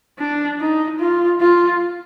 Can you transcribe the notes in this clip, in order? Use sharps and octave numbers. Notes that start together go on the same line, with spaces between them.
D4
D#4
F4
F4